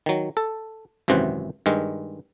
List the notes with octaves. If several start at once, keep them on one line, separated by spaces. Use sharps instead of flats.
D#3 F#3
A4
G#1 F#2 C3 E3 C5 F#5
G2 D#3 G#3